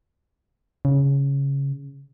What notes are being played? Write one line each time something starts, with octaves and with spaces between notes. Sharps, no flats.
C#3